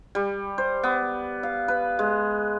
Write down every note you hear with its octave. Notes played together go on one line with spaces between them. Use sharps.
G3
C5
B3
F5
B4
G#3